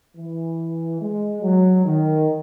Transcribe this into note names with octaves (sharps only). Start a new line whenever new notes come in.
E3
G#3
F#3
D#3